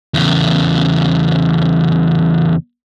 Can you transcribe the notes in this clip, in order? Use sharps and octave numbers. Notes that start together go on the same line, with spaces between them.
E2 C#3